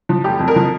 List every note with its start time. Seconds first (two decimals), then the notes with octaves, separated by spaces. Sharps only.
0.09 F3
0.24 F1 G4
0.40 F2
0.48 A#4
0.56 F3